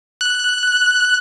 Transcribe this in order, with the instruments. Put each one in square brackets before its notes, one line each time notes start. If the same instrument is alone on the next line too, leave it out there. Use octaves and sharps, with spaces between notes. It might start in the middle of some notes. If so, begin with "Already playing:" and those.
[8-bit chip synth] F#6